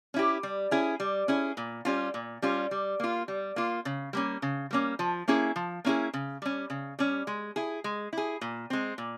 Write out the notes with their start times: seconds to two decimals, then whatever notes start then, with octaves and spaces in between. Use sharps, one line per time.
0.14 C#4 E4 G4
0.43 G3
0.71 C#4 E4 G#4
1.00 G3
1.28 C#4 E4 G#4
1.57 A#2
1.85 G3 C#4 F4
2.14 A#2
2.42 G3 C#4 F4
2.71 G3
3.00 A#3 F4
3.28 G3
3.56 A#3 F4
3.85 C#3
4.13 G3 A#3 C#4
4.42 C#3
4.71 G3 A#3 C#4
4.99 F3
5.28 A#3 C#4 E4 G#4
5.56 F3
5.85 A#3 C#4 E4 G#4
6.13 C#3
6.42 G3 C#4
6.70 C#3
6.99 G3 C#4
7.27 G#3
7.56 E4 G#4
7.84 G#3
8.13 E4 G#4
8.41 A#2
8.70 G#3 C4
8.98 A#2